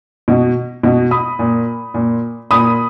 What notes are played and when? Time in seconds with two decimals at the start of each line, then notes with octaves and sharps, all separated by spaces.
0.28 B2
0.83 B2
1.11 B5 D#6
1.39 A#2
1.94 A#2
2.51 A#2 B5 D#6